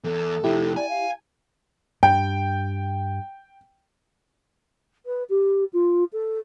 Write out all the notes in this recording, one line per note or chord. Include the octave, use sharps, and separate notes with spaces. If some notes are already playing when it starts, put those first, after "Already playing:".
E2 A4
F2 C3 E4 G4
D5 G#5
F5
G2 G5
B4
G4
F4
A4